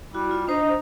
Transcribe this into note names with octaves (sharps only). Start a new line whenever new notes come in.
G3 E4 F#4
F4
D4 D#4 C5 D#5